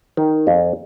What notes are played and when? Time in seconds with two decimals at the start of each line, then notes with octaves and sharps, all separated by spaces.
0.17 D#3
0.47 F2